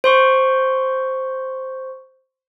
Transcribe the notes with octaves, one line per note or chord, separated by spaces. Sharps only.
C5 C6 C#6